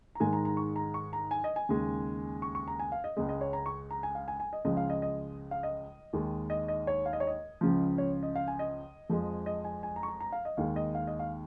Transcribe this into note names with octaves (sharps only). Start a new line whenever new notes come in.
A#5
G#2 D#3 G#3 G#5
A#5
A#5
C#6
A#5
C#6
A#5
G#5
D#5
G#5
D#2 C#3 G#3
C#6
C#6
A#5
G#5
F5
D#5
C#2 C#3 G#3 D#5
D#5
C#5
A#5
C#6
A#5
G#5
F5
G#5
G#5
D#5
C#2 C#3 F3 G#3 D#5
F5
D#5
D#5
F5
D#5
D#2 D#3 G#3
D#5
D#5
C#5
F5
D#5
C#5
D#5
C#2 C#3 F3
C#5
D#5
F5
G#5
D#5
F2 F3 G#3
D#5
G#5
G#5
A#5
C#6
A#5
A#5
F5
D#5
D#2 D#3 G#3 F5
D#5
F5
D#5
F5